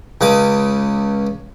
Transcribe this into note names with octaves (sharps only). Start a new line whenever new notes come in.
C#2 C#3 D6 D#6